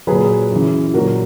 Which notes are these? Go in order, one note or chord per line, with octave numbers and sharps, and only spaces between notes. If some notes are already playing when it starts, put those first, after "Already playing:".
A#2 F#3 G#4 B4
F#2
E3
A#2 F#3 F#4 A#4